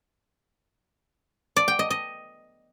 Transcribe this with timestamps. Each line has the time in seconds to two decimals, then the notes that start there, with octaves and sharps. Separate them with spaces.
1.56 D5
1.68 G5
1.79 D#5
1.90 D#5